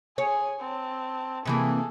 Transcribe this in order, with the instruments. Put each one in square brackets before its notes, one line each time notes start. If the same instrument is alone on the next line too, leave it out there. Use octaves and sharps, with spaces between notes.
[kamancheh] G#4 G#5 [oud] C#5
[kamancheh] C4 A5
[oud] C3 E3 A#3 [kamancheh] G#4 A4